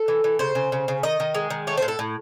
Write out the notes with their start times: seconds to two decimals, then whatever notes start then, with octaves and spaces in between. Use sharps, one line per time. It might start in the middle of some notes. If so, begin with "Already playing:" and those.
Already playing: A4
0.08 E3
0.24 E3
0.39 C#3 C5
0.55 C#3
0.72 C#3
0.88 C#3
1.03 D#3 D#5
1.20 D#3
1.35 G#3
1.50 D#3
1.67 A3 C#5
1.77 C5
1.82 A2
1.88 A4
1.99 A2